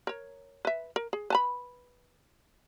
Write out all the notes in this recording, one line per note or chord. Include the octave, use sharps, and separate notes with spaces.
A#4 C#5
B4 E5
A#4
G#4
B4 A5 B5